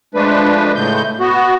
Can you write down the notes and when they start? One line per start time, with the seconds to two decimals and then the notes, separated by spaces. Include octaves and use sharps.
0.15 F3 G#3 A3 D4 B4
0.75 A2 C#3 G#3 A3 G6
1.20 B3 F#4